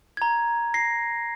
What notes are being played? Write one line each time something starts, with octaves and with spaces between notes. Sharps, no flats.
A#5 G#6
A#6 C7